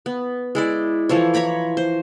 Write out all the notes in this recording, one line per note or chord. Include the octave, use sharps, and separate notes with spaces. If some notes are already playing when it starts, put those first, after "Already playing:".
B3
G#3 E4 D5
E3 F3 A4 C#5
C#5 A#5 B5 D6
C5